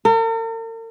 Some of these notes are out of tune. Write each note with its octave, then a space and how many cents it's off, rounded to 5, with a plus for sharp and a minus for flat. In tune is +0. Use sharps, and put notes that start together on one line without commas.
A#4 -45